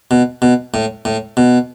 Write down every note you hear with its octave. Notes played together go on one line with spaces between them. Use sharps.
B2
B2
A2
A2
B2